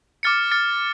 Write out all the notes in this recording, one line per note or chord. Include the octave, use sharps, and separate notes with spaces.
D6 F6 A6 C#7
D6 F6 A6 C#7